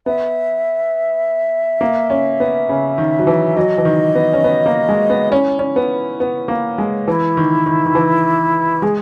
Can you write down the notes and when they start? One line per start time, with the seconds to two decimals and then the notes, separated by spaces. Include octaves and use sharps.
0.06 B3 E5
1.81 A#3
2.10 C#4
2.40 B3
2.69 C#3
2.98 D#3
3.19 F#3
3.27 E3
3.56 F#3 D#5
3.78 E3
3.85 D#3
4.15 B3
4.33 C#4
4.44 B3
4.66 A#3
4.89 G#3
5.10 B3
5.32 C#4 E4
5.59 C#4
5.76 B3
6.20 B3
6.48 A#3
6.78 G#3
7.07 E3 E4
7.37 D#3
7.66 D#3
7.86 D#3
7.95 E3
8.82 G#3 G#4